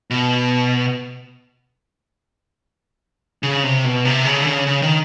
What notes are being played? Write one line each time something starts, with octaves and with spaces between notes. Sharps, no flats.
B2
C#3
C3
B2
C3
C#3
D3
C#3
C#3
D#3